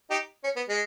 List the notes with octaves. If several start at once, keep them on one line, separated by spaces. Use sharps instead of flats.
D#4 G4
C#4
B3
G#3